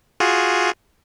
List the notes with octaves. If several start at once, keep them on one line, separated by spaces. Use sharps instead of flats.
F4 F#4 G#4